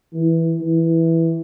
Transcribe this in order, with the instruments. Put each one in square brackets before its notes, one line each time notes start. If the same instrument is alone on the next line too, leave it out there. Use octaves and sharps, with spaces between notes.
[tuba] E3
E3